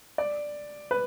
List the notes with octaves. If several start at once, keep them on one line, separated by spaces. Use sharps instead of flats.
D5
B4